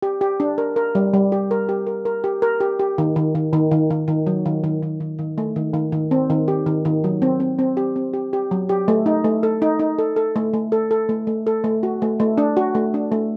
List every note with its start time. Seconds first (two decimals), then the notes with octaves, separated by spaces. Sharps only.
0.02 G4
0.21 G4
0.40 D4
0.58 A#4
0.76 A#4
0.95 G3
1.14 G3
1.32 G4
1.51 A#4
1.69 G4
1.87 A#4
2.05 A#4
2.24 G4
2.42 A#4
2.60 G4
2.79 G4
2.98 D#3
3.16 D#3
3.35 D#3
3.53 D#3
3.71 D#3
3.90 D#3
4.08 D#3
4.27 F#3
4.46 D#3
4.64 D#3
4.83 D#3
5.00 D#3
5.19 D#3
5.38 A3
5.56 D#3
5.74 D#3
5.92 D#3
6.11 C4
6.30 D#3
6.48 G4
6.66 D#3
6.85 D#3
7.04 F#3
7.22 C4
7.40 C4
7.59 C4
7.77 G4
7.96 C4
8.14 G4
8.33 G4
8.51 F#3
8.69 G4
8.88 A3
9.06 D#4
9.24 A3
9.43 A4
9.62 D#4
9.79 D#4
9.99 A4
10.16 A4
10.36 A3
10.53 A3
10.72 A4
10.91 A4
11.09 A3
11.27 A3
11.47 A4
11.64 A3
11.83 F#4
12.02 A3
12.20 A3
12.38 D4
12.57 F#4
12.75 A3
12.94 D4
13.12 A3